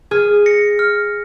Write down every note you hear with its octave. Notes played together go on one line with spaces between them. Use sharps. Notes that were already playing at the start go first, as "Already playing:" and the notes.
G#4 F6
A#6 C#7
F6